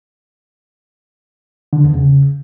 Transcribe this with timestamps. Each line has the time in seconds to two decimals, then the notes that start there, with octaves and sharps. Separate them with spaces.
1.73 D3
1.84 E2
1.95 C#3